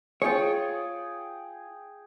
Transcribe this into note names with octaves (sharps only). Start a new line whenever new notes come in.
F4 G#4 C#5 G5